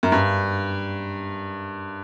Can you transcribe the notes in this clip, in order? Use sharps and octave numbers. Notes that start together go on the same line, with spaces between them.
F#2
G2